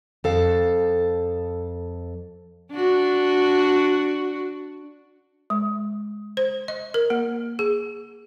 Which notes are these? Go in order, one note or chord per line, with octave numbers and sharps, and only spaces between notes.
F2 A4 F5
D4 F#4
G#3
C5
D#5
A#4
A#3
G#4